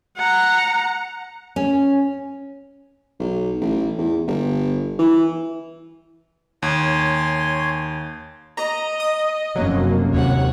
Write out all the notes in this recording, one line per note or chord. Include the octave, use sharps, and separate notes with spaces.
F#5 A#5
C#4
B1
A1
E2
G1
E3
D#2 C#5 G#5 C6
D#5 A#5
D#6
F1 F#2 F#3 A#3
D#2 C3 C#5 F#5